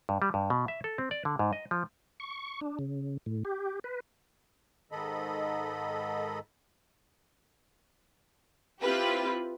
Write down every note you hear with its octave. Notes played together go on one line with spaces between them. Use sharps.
G2
G3
G2
B2
E5
A4
C4
D5
D3
G#2
D#5
F3
C#6
D4
C#3
A2
G4
B4
G#2 D#3 A4 D#5 B5
C4 E4 F4 G4 B4